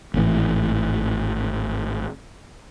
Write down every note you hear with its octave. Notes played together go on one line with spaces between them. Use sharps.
G#1 A2 C#3 E3